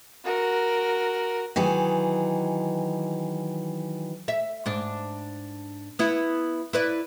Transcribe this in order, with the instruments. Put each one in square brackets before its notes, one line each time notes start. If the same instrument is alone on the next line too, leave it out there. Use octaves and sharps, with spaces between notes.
[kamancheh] F#4 A#4
[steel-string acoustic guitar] D#3 E3 F#3 G#4
[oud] E5
G#2 D4
B3 E4
E4 B4 D5